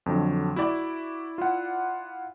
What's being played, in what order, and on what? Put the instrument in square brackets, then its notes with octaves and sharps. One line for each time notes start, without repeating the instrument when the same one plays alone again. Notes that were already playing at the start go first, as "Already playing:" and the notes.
[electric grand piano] F2 D3 F#3
[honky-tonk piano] E4 D5 [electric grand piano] F#4
[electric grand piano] F4 F#5